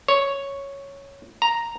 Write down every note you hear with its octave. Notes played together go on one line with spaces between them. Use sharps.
C#5
A#5